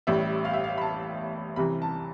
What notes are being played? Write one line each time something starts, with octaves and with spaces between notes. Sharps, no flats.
A1 A2 G3 E5
F5
E5
F5
B5
A5
C2 C3 E3 B5
A5